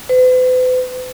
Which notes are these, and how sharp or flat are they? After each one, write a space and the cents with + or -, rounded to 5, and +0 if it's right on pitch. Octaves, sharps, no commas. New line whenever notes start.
B4 +45